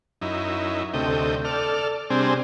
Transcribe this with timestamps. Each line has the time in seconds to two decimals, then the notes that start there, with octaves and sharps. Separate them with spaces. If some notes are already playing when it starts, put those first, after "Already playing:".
0.22 F#2 D#4 E4
0.94 D2 C3 A3 D#5 G5
1.45 A4 D5 F6
2.10 C3 G3 C4 D4 G#4